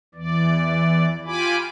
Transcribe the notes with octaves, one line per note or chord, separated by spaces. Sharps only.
E2 E3 D5
F4 G4 G#5 B5 D6